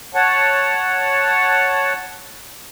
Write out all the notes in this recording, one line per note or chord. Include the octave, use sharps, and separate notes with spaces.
C#5 F#5 A5